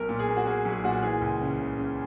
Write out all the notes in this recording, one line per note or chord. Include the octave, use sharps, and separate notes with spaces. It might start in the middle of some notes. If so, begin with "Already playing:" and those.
Already playing: B1 A#4
A#2
G#4
A#3
F#4
A#3 G#4
B1
G#4
A#2 F#4
E3 G#4
C#2
C#3
C#3
C#3